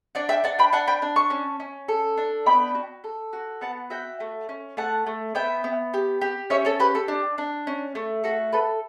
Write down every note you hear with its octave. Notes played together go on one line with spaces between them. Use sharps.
D4 D5 F#5
E5 G5
D4 F#5 A5
G5 B5
D4 F#5 A5
G5 B5
D4
A5 C#6
C#4
C#4
A4
D4
B3 G5 B5
F#4
A4
F#4
B3 F#5 A5
F#4 E5 G5
A3
C#4
A3 F#5 A5
A3
B3 E5 G5
B3
G4
G4
C#4 C#5 E5
A4 C#5
G4 B4
A4
D4
D4
C#4
A3
F#4 A4
A4 B4